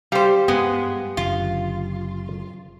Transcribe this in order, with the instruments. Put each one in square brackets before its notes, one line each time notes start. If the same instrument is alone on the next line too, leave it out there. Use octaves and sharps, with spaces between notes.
[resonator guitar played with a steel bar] G3 C5 [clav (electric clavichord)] G4 F5
[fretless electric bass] G2 [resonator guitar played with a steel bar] G#3 B3
[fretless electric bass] F#1 F#2 D3 [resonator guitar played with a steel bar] F4